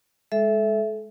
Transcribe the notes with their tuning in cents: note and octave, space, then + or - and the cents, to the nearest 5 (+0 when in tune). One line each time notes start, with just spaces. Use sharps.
G#3 +0 A4 -25 E5 +0